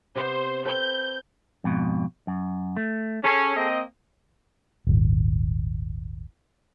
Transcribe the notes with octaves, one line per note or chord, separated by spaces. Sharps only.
C3 B3 C5
C4 A4 B4 G6
F2 G#2 B2
F#2
A3
C#4 G#4 A4
A#3 C4 D#5
D#1 G#1